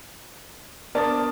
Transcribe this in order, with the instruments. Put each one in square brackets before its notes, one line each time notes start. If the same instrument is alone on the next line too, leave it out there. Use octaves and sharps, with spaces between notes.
[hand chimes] B3 D4 D#6 [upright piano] A#4 D5 A5